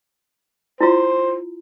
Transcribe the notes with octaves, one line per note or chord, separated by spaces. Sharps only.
E4 F4 C5